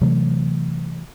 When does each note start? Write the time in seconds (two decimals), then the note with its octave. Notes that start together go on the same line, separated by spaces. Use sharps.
0.01 C3 E3 F#3 A3